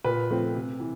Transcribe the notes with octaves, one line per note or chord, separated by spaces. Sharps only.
A#2 B4
F3 A3 C4
C3
E3